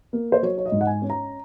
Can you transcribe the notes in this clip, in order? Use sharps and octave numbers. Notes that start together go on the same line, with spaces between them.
A#3
C5
F#3 C#5
C#5
D#5
G#2
F#5
G#5
C#4
A#5